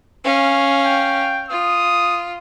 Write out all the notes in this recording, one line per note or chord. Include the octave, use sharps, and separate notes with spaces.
C#4 F5
G5
F4 D#6